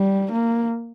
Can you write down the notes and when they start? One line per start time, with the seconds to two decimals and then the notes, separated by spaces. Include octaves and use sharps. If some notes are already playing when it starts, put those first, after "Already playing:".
Already playing: G3
0.31 A#3